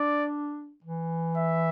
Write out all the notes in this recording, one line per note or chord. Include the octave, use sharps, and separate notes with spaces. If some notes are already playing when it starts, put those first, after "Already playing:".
Already playing: D4 D5
E3
E5